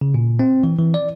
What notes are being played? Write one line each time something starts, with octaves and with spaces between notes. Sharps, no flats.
C#3
A#2
C4
E3
E3
D5